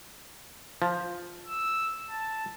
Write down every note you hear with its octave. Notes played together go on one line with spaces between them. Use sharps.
F3
E6
A5